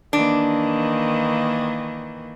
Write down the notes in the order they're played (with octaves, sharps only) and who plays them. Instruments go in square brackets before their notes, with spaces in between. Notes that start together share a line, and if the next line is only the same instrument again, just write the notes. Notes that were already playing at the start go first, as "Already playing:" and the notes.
[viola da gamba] D#3 E3 A#3 [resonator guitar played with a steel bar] D4